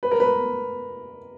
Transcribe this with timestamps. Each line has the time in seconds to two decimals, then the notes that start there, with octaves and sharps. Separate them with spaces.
0.03 B4
0.11 A#4
0.20 B4